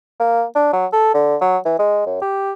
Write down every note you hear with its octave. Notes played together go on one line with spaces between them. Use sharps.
A#3
D4
F#3
A4
D3
F#3
E3
G#3
F#2
G4